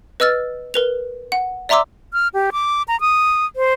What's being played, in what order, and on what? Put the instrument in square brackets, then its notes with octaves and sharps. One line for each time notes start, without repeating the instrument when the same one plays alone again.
[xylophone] B4 D#5 E6 F6 A6
A#4 B4 F7
F#5
D5 E5 A#5 C6 D6 E6
[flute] F6
G4
D6
A#5
D#6
C5